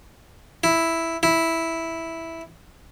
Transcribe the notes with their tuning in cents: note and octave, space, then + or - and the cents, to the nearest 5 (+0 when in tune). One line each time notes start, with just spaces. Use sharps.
E4 +0
E4 -5